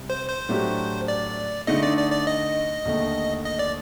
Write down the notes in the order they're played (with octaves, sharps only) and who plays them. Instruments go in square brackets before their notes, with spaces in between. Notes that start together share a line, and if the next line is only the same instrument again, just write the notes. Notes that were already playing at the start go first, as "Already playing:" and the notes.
Already playing: [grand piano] C3 G3
[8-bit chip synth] C5
C5
[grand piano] A2 F#3 A3 D4 G4
[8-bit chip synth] D5
[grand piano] D3 A3 D#4 [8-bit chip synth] D#5
[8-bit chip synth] D5
D5
D5
D#5
[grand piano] D#2 D3 A3
[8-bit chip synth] D#5
D5